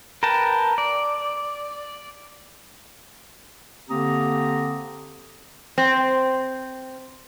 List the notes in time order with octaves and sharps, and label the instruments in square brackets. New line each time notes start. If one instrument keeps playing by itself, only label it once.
[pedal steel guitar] A#4 B4 G5 A5
D5
[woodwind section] D3 A#3 C4 G4 A#5 D#6
[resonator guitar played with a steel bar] C4